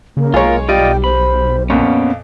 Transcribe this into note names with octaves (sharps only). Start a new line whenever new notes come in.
C#3 A#3
B1 G#3 F4 A#4 C#5
G3 F4 D5 D#5 G5
C5 B5
F2 A#2 B3 C#4 F5